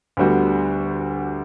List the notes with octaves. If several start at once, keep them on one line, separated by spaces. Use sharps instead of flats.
D2 D3 G3 B3 F#4